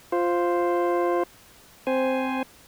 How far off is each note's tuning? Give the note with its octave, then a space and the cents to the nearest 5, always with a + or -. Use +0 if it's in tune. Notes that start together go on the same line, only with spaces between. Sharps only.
F4 +0 C5 +0
C4 -5 C5 +0 G#5 +0